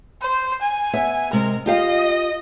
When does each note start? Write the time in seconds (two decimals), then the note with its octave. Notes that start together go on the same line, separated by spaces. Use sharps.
0.22 C5
0.61 G#5
0.93 B3 E5
1.33 C3 G#3 A#4
1.66 F4 G4 D#5 F5